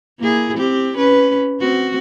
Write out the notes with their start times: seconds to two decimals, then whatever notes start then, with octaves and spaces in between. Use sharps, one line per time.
0.19 A#3 E4 G#4
0.57 C4 G4
0.97 C#4 B4
1.60 C4 F#4